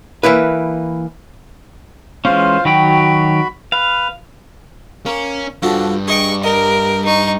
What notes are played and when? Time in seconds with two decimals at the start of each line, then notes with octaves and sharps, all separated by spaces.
0.23 E3 A#3 E4 B4
2.25 E3 G#3 C#4 F4 C5 F5
2.65 D#3 F#3 F#4 G5 B5
3.72 B4 F5
5.06 A#3 C#4
5.63 G2 F3 F#4 A4
6.08 G#4 D#5 G5 C#6
6.44 A#4 D#5
7.05 D#4 C#6